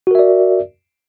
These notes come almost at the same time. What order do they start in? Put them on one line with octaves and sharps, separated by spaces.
F#4 A#4 E5 D5